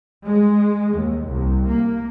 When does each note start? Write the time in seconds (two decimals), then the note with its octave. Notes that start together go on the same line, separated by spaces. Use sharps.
0.25 G#3
0.96 D#2
1.26 C2
1.67 A#3